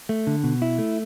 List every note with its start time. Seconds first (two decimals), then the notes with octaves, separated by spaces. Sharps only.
0.09 A3
0.27 D3
0.43 B2
0.62 E4
0.78 A3